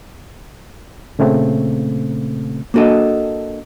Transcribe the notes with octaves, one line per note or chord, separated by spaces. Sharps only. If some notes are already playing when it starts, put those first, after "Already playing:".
A#2 C#3 A3 C4
A#3 D4 F#4 A4 D#5